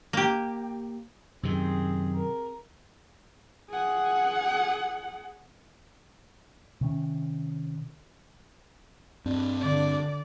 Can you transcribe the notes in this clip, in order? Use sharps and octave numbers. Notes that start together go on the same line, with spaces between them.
A#3 G4
F#2 C3 D#3 C4 G#4
A#4
G#4 F#5
C3 D#3 C#4
G2 C4 D4
D3 D5